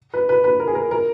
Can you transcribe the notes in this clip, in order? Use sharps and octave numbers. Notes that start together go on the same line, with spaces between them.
B4
B4
B4
A#4
G#4
A#4
A#4